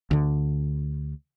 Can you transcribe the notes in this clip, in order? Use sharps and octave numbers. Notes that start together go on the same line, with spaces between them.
D2 D3